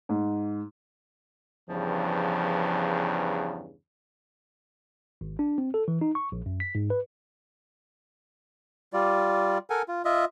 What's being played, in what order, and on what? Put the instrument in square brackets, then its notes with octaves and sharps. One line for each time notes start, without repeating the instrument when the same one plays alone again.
[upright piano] G#2
[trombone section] E2 G2 C#3 [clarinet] F3
[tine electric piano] G#1
D4
C4
A4
E3
D#4
C#6
A#1
F#2
B6
G#2
B4
[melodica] G3 F4 D5
A4 A#4 F#5 G#5
F4
F4 D#5 E5